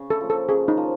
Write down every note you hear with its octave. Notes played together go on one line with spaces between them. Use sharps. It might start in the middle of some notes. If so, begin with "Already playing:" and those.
Already playing: C#3
A4
F3 A#3
A4
C#3 G#4
D#4
F3 A#3